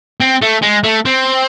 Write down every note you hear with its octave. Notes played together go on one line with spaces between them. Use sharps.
C4
A3
G#3
A3
C4